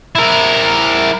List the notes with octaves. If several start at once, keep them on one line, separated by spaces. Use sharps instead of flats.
E4 A#4